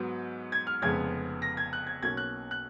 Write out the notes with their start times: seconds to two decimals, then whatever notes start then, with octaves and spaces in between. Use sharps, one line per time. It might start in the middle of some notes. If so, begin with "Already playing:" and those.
Already playing: G#2 F#3 B3
0.52 G#6
0.67 F6
0.82 F1 F2 C#3 G#3 B3 G#6
1.42 A#6
1.57 G#6
1.73 F#6
1.87 G#6
2.02 B1 B2 A#3 C#4 G#6
2.17 F#6
2.51 F#6